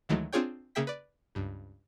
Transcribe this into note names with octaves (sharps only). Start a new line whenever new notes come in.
D2 D#3 E3 F#3 G#3 A3
C4 D4 F4 G#4 C#5 G5
C#3 A#3 G#4 E5 G5 B6
B4 D5
C#2 G2